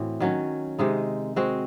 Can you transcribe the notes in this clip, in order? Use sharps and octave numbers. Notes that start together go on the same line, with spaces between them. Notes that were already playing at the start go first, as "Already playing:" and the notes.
Already playing: A2 E3 C4 F#4
D#3 F#3 C#4
C3 D#3 G#3 D#4
G#3 C4 F#4